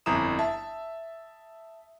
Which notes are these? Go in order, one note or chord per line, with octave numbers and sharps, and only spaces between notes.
G1 F2 E4 A#5 D#6 E7
E5 A5